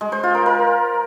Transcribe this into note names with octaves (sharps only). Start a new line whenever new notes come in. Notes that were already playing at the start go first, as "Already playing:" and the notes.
G#3
C5
F4
A#4
A#4